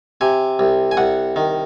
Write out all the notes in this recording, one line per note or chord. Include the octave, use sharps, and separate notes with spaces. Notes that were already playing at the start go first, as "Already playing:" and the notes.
C3 G#5
C2
G#5
C2 F#5
D#3